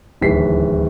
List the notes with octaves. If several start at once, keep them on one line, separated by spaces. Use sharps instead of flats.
D1 D#2 E3 B6 C7